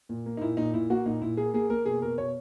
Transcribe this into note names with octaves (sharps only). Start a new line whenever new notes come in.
A#2
A#3
D#4
A#2 E4
A#2 D#4
A#2 E4
A#3 F#4
A#2 D#4
A#2 E4
A#3 G#4
A#3 G#4
A#3 A#4
B2 G#4
B2 A#4
B2 C#5